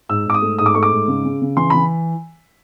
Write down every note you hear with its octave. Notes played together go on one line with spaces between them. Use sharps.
G#2 E6
G#2 D6
D#6
A3
G#2 D#6
D6
A3 C#6
D6
G#2
C#3
C#3
C#3
E3 C6
E3 B5